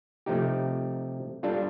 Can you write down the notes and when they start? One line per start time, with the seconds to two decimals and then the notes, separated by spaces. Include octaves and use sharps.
0.26 C3 F3 A3 D#4 G4
1.43 G3 D4 F4 A4